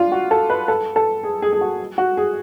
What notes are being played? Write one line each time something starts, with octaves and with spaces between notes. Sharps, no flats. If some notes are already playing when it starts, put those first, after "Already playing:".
Already playing: D4 F4
F#4
A4
B4
A4
A4
G#4
G#4
G#4
F#4
F#4
G#4